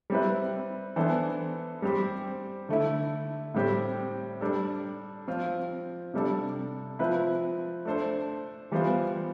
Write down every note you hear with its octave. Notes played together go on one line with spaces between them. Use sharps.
G3 C4 E4 B4
E3 B3 D4 A4 C5
G3 C4 G4 C5
D3 A3 E4
A2 G3 C4 G4
G3 D4 A4
F3 C4 F4
C3 G3 D4 A4
F3 C4 E4 B4
A3 D4 A4 C5
E3 G3 B3 F4 C5